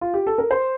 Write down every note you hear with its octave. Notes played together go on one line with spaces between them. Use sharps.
F4
G4
A4
A#4
C5